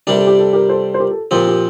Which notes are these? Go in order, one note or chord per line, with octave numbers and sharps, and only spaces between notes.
C3 G3 D4 G4 A#4
A4
G4
A4
G4 A#4
A4 C5
C5
G4 A#4
A4
A#2 F3 C4 G4 A#4
G4 A#4